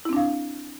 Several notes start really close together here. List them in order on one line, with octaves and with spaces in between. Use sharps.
E4 C4 D4 F5